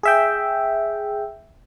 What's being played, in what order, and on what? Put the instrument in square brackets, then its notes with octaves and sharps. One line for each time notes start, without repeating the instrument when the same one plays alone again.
[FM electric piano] G#4 E5 G5